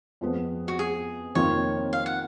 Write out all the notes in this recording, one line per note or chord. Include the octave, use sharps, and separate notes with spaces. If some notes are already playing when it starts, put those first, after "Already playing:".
F2 F3 G#3 B3
F#4
G#4
F1 F2 D#3 A#3 F4 C#5
F5
F#5